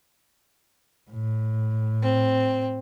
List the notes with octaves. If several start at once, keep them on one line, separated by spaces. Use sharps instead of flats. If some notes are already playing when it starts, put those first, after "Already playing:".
A2
C4